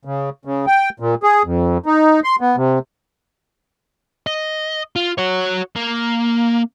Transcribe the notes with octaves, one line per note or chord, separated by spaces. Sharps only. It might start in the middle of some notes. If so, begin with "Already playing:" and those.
C#3
C#3
G5
A#2
G#4
F2
D#4
C6
B3
C3
D#5
F4
F#4 C#5
A#3